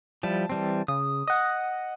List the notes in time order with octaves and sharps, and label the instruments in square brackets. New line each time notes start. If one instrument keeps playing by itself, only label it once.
[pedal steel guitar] F3 G3 E4 [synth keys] A5
[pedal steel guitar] E3 G3 C4
[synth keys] C#3 [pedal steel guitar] D#6
[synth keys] D#5 F#5